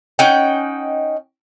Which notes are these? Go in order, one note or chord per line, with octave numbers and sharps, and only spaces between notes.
C#4 D#4 F#5 G5